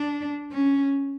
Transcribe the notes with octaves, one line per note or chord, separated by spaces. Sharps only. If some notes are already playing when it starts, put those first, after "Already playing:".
Already playing: D4
C#4